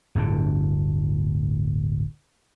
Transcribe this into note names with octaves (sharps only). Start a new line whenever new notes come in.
D1 G1 A2 D3